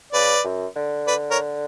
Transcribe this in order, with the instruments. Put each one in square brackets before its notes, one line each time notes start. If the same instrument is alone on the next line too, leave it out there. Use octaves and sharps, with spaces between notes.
[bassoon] C#3 [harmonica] B4 D5
[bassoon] F#2
D3
[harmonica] B4 D5
A#4 C#5